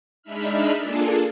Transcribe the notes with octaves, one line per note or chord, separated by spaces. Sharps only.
G#3 D4 D#4 E5 B5 F6
A#3 D4 F4 G#4 A4